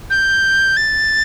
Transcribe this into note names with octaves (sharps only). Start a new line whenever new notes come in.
G6
A6